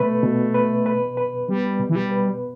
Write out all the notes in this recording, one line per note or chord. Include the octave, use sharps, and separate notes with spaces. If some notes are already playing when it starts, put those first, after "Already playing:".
Already playing: B2 A3 B4
B2
B4
B4
B4
G3 B3
B2
E3
G3
B4